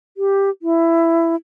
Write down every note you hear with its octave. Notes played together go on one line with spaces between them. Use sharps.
G4
E4